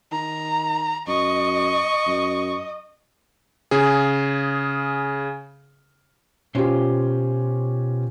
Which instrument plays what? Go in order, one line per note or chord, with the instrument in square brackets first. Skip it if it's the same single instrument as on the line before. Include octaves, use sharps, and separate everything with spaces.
[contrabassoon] D#3 [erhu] A#5
[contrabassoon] F#2 [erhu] D#5 [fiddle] C#6
[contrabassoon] F#2
[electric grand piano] C#3 G#4
[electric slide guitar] B2 C5 [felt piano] C#4 F4 G4